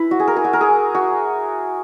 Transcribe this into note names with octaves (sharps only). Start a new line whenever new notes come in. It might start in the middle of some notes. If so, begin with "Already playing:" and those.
Already playing: E4 B4
F#4
G#4
A#4
G#4
F#4
A#4
G#4
F#4